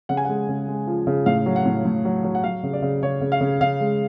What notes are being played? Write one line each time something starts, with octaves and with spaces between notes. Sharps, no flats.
C#3 F#5
G#5
G#3 F#5
C#3
G#3
F3
C#3
A2 F5
F#3
F#5
A2
A2
F#3
F#3
F#5
F#3 F5
C#3
D5
C#3
C#3 C#5
C#3
F5
C#3
C#3 F5
G#3